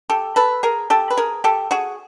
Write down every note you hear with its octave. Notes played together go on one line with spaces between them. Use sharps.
G4 A4
A4 B4
G#4 A#4
G4 A4
B4
G#4 A#4
G4 A4
F#4 G#4